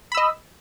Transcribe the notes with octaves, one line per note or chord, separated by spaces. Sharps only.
D#5 B5 E6